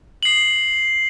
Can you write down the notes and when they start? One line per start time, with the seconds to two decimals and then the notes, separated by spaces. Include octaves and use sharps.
0.23 C7 F#7